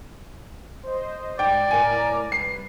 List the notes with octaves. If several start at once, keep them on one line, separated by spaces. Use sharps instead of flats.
C5 D#5
G#2 D5 G5
A2 A#4 G#5 A#5
C2 B4 C7